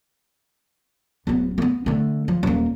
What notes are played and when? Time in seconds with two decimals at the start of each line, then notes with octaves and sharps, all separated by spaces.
1.27 D1 B3
1.58 A#3 B3
1.86 D3 A3
2.28 F3
2.43 D#1 A#3